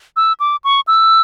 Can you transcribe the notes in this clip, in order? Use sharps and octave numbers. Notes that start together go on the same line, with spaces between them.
E6
D6
C#6
E6